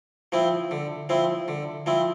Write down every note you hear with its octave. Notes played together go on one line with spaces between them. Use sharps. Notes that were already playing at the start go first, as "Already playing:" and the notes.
F3 C4 E4
D3
F3 C4 E4
D3
F3 C4 E4